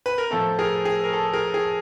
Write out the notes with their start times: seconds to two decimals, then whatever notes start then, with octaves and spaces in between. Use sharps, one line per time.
0.06 B4
0.18 A#4
0.31 A2 F3 A3 A4
0.59 G#4 A#4
0.85 G#4
1.03 A#4
1.13 A4
1.33 G#4 A#4
1.54 G#4